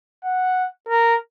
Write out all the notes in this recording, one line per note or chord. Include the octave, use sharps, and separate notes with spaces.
F#5
A#4